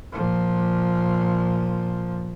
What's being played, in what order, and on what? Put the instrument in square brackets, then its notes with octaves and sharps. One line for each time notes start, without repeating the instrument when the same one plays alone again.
[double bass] A#2 F3